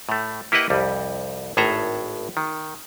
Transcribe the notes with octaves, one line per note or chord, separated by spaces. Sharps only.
A2 A3
A#3 E4 G4 B4 D#5 F#5
C2 F2 G3
G#1 A2 G#4 A4 E5 A#5
D#3